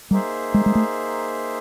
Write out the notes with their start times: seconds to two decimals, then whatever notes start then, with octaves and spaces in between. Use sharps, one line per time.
0.11 G3 A#3 D#4 G#4 C5 E5
0.54 G#3
0.66 G#3
0.75 A3